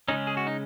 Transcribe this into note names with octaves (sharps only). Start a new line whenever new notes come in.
C#3 G#3 C#4 D#4
G#4
F#4
D#4